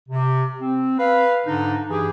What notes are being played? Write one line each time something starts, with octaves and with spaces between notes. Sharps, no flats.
C3
C4
B4 F5
G#2 D3 D4 D#4
G2 E3 G4 G#4